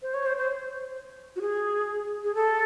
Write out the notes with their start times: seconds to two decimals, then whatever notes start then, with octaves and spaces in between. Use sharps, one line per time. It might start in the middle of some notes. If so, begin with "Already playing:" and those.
0.02 C5
0.14 C#5
0.26 C5
0.37 C5
1.36 F#4
1.41 G#4
2.24 G#4
2.35 A4